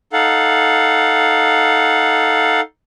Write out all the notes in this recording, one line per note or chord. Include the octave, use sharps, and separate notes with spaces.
D#4 A4 F5 F#5